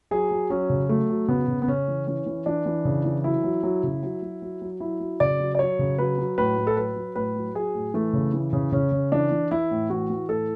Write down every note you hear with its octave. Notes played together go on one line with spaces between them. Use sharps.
F#3 G#4
F#3
F#3 C#4
C#3
F#3 A3
F#3
C#3 B3
C#3
B3
C#3 C#4
E3
E3 C#4
E3
E3 D4
E3
C#3
E3
F#3 E4
F#3
F#3
C#3
F#3
F#3
F#3
F#3
F#3 E4
F#3
C#3 D5
F#3
D5
F#3 C#5
C#3
F#3 B4
F#3
A2 B4
A2
A4
F#3 B4
F#3
A2 B4
F#3
F#3 G#4
A2
E3 A3
C#3
E3
C#3
C#3 C#4
C#3
E3 D4
E3
E3 E4
A2
E3 F#4
E3
A2 A4